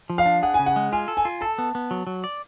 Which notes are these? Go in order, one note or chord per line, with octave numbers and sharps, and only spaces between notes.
F3
F5
D4
G#4 F#5
G#5
C#3
F#5
G#3
F4 G#5
A4
G#5
F4
A4 A5
B3
B3
F#3
F#3
D5